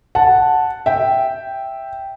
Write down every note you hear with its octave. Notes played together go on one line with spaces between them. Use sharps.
F#5 A5
E5 G5